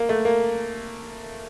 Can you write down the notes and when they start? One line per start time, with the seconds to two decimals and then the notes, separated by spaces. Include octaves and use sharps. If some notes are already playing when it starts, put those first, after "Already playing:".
Already playing: A#3
0.09 A3
0.25 A#3